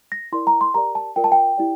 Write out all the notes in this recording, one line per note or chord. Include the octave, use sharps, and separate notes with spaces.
A#6
E4 A#4 D5 C6
A#5
C6
G4 A#4 D5 A#5
A5
F4 A#4 D5 G5
A5
G5
E4 G4 D5